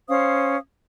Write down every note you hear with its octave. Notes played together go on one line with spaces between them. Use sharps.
C#4 C5 F5 D#6